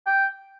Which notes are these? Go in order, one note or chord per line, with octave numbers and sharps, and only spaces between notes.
G5